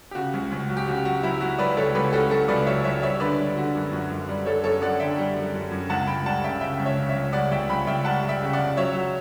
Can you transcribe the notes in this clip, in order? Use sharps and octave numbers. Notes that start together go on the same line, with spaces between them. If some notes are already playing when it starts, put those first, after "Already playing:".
G4
C#3 F#4
C#2
C#2
F#3
G4
C#3 F#4
F#3 F#4
F#3 E4
F#3 F#4
F#3 B4 D5
C#2 A4 C#5
C#2 G4 B4
C#3 F#4 A4
F#3 F#4 A4
C#2 B4 D5
F#3 C#5 E5
F#3 C#5 E5
G3 C#5 E5
D3 B4 D5
G3
D3 F#4
F#2
F#2
F#2
G3
G3 A4 C#5
F#2 A4 C#5
F#2 D5 F#5
D3 E5 G5
G3
F#2
F#2
F#2
C#2 F#5 A5
C#2 G5 B5
G3 F#5 A5
C#3 E5 G5
C#3 E5 G5
C#2
C#5 E5
C#3
C#5 E5
C#2
G3 D5 F#5
C#2 E5 G5
C#2 G5 B5
C#2 E5 G5
G3 F#5 A5
G3
E5 G5
C#3
D5 F#5
C#3
F#3 C#5 E5
F#3